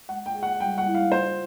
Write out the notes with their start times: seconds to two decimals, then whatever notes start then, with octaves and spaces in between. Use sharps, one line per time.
0.09 G#3 F#5
0.26 G5
0.34 G#4
0.43 F#5
0.60 G3 G5
0.78 F#5
0.86 E4
0.94 F5
1.11 F4 C5